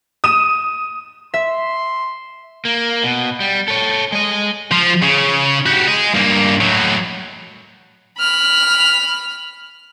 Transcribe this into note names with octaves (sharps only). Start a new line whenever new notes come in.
D#6 D#7 E7
E5 C6
A#3
B2
G3
A4 C#5
G#3 D#5
F3
C#3
F#4 G4
D#5 G#5
G2 A#3
A2 F#3
B5 F6